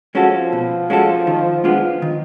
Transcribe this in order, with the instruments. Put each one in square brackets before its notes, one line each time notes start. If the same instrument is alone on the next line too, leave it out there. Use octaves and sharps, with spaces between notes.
[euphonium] F3 [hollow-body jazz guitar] G#3 C#4 F#4 A4
[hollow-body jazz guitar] B2
G#3 C#4 F#4 A4
D#3
G#3 B3 D4 F4
D#3